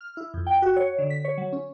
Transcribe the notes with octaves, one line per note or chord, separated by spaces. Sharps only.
F6
E4
F2
G5
F#4
C#5
D3
B6
C#5
F#3
C#4